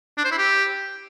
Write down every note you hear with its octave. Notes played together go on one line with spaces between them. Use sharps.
D4
C5
E4
G4